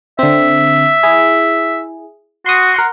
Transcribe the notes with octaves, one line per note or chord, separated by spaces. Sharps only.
D3 C4 E5
E4 G#4
F#4 C6 D#6
A#4 F#5 C6